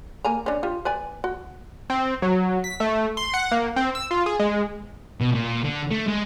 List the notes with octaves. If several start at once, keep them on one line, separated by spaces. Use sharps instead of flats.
A#3 G#5 A#5
C#4 D4
F4 G4
B4 D5 G#5
F#4
C4
F#3
B6
A3
C6
F#5
A#3
C4
E6
F4
G#4
G#3
B2
A#2
D3
A3
G#3